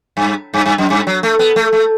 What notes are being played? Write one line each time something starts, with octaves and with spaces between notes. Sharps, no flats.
G2
G2
G2
F#2
G2
F#3
A3
B3
A3
A3